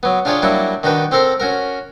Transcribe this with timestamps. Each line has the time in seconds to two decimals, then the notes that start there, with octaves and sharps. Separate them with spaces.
0.03 F#3 B3
0.25 D4 F4 G4 G#4 C#5 D5
0.42 F#3 G3 A#3 D4 E4 F#5
0.83 D#3 D4 F#4 G4 B4
1.11 C4 G4 A4 A#4 C5
1.40 C#4 F#4 A#4